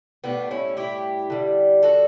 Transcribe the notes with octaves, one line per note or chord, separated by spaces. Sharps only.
A2 G3 B3 D4
C#4 E4
E4 G4
D3 G3
F#4 A4